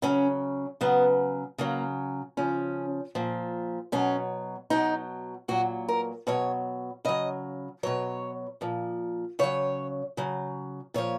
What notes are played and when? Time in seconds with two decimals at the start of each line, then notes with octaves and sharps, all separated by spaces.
0.02 C#3 F#3 C#4
0.81 C#3 F#3 B3
1.58 C#3 F#3 A#3
2.37 C#3 F3 C#4
3.15 A#2 F3
3.92 B2 F#3 C#4
4.70 B2 F#3 D#4
5.48 A#2 F#3 F#4
5.88 A#4
6.27 B2 F#3 C#5
7.05 C#3 F#3 D#5
7.83 B2 F#3 C#5
8.61 A#2 F3
9.39 C#3 F#3 C#5
10.17 C#3 F#3
10.94 A#2 F3 C#5